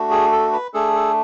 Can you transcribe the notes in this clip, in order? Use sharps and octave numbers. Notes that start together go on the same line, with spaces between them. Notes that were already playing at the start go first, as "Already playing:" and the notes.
Already playing: A3 D4 F#4
G#4
A4
B4
A3 D4 G#4 A4
A4